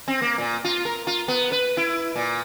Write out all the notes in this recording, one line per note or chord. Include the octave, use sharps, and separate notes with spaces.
C4
A#3
A#2
F4
A#4
F4
B3
B4
E4
A#2